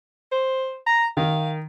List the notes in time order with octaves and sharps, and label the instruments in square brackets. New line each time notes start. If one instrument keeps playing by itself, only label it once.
[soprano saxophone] C5
A#5
[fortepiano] D#3 [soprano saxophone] F5